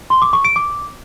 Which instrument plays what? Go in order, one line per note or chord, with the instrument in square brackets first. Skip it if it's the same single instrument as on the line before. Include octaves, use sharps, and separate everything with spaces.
[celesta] C6
D6
C#6
D7
D6